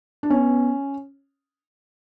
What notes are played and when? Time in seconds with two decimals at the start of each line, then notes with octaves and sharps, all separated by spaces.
0.23 D4
0.30 B3 C#4